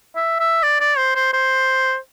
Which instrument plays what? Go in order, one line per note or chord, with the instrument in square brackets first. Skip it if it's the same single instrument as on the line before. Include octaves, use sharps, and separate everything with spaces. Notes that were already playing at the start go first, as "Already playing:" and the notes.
[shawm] E5
E5
D5
D5
C5
C5
C5